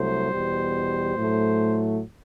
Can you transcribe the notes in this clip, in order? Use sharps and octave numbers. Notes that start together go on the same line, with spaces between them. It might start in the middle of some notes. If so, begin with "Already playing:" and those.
Already playing: C2 C3 F#3 A3 C5
E2 B2 G3
A2 F#3 A3